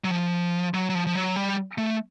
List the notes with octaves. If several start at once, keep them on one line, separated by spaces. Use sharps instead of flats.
F#3
F3
F#3
F#3
F3
F3
F#3
G3
A3